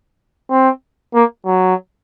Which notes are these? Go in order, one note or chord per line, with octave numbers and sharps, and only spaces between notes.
C4
A#3
F#3